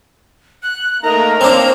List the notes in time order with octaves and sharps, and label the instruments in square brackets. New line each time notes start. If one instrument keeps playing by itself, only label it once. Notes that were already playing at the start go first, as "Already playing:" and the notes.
[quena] F#6
[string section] A3 A#3 [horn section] D#4 D#5 A#5 [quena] A#4
[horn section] A#3 [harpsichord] C4 D4 [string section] C5 C#5